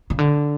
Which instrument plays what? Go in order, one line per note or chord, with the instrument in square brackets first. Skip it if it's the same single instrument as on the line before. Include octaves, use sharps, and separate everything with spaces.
[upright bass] C#3
D3